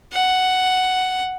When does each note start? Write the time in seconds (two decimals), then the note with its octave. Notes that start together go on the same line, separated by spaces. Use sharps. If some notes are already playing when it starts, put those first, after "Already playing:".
0.13 F#5